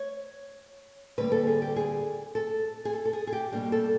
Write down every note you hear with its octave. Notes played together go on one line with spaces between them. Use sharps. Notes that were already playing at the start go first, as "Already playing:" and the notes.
Already playing: C#5
D2 D3 G3 A#3 B4
A4
G#4
G4
G#4
A4
G#4
A4
A4
G#4
G#4
G4
B2 G3 A#3 D4 G4
A4